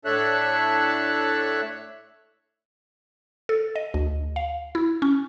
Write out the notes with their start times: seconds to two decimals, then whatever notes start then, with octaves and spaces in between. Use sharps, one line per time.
0.05 A2 D4 A4 C#5 E5 F#6
3.49 A4
3.76 D#5
3.94 D2
4.36 F5
4.75 E4
5.02 C#4